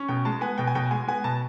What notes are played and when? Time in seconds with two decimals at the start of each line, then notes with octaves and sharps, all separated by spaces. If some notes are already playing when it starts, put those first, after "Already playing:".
Already playing: C#4
0.08 B2 G5
0.25 G#3 A5
0.41 B3 G#5
0.58 B2 G5
0.67 G#5
0.75 B2 G5
0.91 G#3 G#5
1.08 B3 G#5
1.24 B2 A5